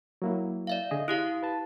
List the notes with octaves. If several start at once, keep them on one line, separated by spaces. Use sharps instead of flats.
F#3 A#3 E4
D5 E5 F5
D3 G#4 D#5
E4 G4 F5 D#6
B4 A5